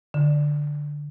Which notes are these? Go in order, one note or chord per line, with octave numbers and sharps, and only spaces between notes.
D3